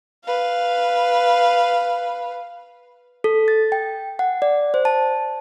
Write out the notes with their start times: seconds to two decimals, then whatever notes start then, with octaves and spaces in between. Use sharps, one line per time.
0.25 B4 F5
3.24 A4
3.48 A6
3.72 G5
4.19 F#5
4.42 D5
4.74 C5
4.85 A5